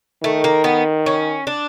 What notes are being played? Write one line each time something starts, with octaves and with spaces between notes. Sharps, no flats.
D#3 A3
A#3
B3
C#4
D4